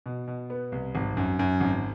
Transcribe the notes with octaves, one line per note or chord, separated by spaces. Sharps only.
B2
B2
B3
C2
G#1
F#2
F#2
G#1